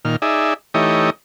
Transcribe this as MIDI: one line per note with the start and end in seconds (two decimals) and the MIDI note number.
0.05 0.16 46
0.05 0.16 51
0.05 0.16 89
0.22 0.54 63
0.22 0.54 68
0.22 0.54 74
0.22 0.54 76
0.74 1.10 52
0.74 1.10 57
0.74 1.10 63
0.74 1.10 67
0.74 1.10 73
0.74 1.10 75